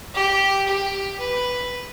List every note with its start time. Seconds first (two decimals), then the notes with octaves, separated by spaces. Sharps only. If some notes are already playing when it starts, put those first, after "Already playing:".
0.14 G4
0.67 G4
1.19 B4